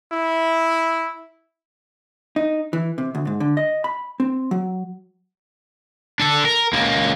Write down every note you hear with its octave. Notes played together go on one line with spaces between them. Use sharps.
E4
D#4
E3
C3
D2
G#2
D3
D#5
B5
C4
F#3
D4 A4
A#4
C#2 A#3